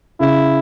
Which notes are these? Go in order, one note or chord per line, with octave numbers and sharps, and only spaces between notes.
C#3 E4